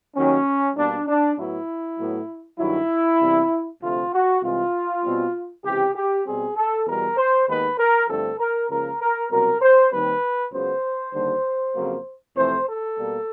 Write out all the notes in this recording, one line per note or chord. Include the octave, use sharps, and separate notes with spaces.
D#2 D#3 F#3 C#4
B2 G3 A#3 D4
D4
A2 F#3 B3 E4
A2 F#3 B3
G2 D#3 F#3 E4
E2 C3 E3 G3
D2 C3 F3 A3 C4 F4
F#4
C2 C3 E3 G#3 F4
B2 G3 C4
C#2 C3 E3 G4
G4
B2 G3 C4 G#4
A4
E2 B2 G3 A#4
C5
D#2 D#3 G#3 B3 B4
A#4
G2 D3 F3 A3 C4 A4
A#4
C#2 C#3 F3 A#3 A#4
A#4
C2 B2 F#3 A#4
C5
D#2 D#3 G3 C4 B4
C#2 C#3 F#3 B3 C5
D#2 D3 G3
F2 C#3 F#3 A#3
F2 C3 E3 A3 C5
A4
B2 G3 A#3